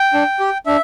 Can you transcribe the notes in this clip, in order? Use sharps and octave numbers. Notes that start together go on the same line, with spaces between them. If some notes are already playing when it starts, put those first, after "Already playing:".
Already playing: G5
D4
G4
D4 E5